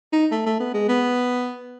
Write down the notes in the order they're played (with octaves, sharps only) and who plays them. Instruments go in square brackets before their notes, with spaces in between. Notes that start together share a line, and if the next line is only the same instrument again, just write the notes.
[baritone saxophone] D#4
A3
A3
B3
G#3
B3